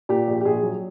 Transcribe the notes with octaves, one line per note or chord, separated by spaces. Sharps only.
A#2 G4
A#1
G4
A#1 G#4
F#3